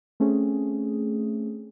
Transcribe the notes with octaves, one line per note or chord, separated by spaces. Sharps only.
A3 C4 C#4 G#4